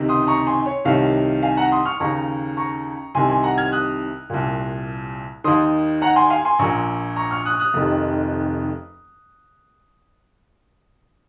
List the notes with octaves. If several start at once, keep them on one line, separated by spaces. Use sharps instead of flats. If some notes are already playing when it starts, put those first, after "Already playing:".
Already playing: C#2 C3 D#3
C6 D#6
A#5 C#6
G#5 C6
C#5
C2 C3 D#3 C#5 F5
F5 G#5
F#5 A#5
C6 D#6
C#6 F6
D#2 C#3 A#5 C#6
A#5 C#6
C2 C3 D#3 G#5 C6
G#5 C6
F#5 A#5
F6 G#6
D#6 F#6
C2 A#2
D#2 D#3 C6 D#6
F#5 A#5
G#5 C6
F5 G#5
G#5 C6
A#1 A#2 A#5 C#6
A#5 C#6
C#6 F6
D#6 F#6
D#6 F#6
F1 F2 C3 D#3